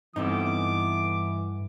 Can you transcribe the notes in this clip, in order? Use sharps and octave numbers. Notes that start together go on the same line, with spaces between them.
G2 E3 B3 C4 D#4 A4 D6